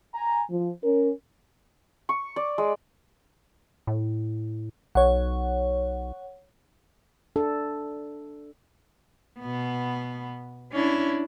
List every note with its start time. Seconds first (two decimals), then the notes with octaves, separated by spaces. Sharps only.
0.14 G#5 A#5
0.50 F3
0.83 C#4 A#4
2.09 C#6
2.36 D5
2.58 G#3
3.87 A2
4.95 B1 C#5 F#5
7.36 D4 A4
9.40 B2 B3
10.72 C#4 D4 E4